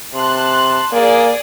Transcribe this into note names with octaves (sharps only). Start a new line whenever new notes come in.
C3 A5 C6 F#6
A#3 G#4 D5